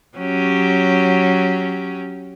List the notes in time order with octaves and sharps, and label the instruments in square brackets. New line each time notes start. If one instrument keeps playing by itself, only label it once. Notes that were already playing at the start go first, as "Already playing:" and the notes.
[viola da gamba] F#3 C#4 G4